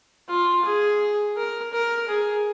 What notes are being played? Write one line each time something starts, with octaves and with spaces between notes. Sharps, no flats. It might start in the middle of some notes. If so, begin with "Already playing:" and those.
F4
G#4
A#4
A#4
G#4